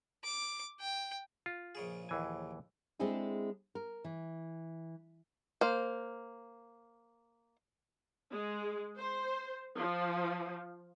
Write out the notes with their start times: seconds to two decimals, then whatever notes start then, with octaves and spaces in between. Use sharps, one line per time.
0.24 D6
0.81 G5
1.46 F4
1.75 A#1 C#3 G#4
2.09 D#2 E3 G#5
2.99 G#3 C4 D4 E4 G#4 A4
3.75 A#4
4.04 E3
5.61 A#3 C5
8.31 G#3
8.98 C5
9.77 F3